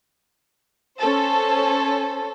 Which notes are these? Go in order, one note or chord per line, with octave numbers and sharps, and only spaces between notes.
C#4 A4 C5